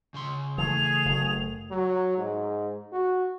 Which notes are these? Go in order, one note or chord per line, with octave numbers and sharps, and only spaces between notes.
C#3 C6
E3 A3 G#4 F7
F#1 A3
F#3
G#2
F#4